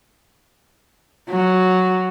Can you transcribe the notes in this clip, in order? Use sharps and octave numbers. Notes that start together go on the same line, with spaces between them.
F#3